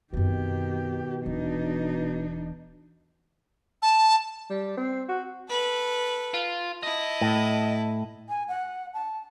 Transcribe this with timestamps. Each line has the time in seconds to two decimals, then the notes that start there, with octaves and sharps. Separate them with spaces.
0.13 F#2 B2 D#3 C4 G4
1.25 D#1 E3 D4 D#4
3.82 A5
4.50 G3
4.77 C4
5.09 F#4
5.49 A4 B4
6.34 F4
6.83 E4 D#5 A5
7.21 A2
8.29 G#5
8.48 F#5
8.94 A5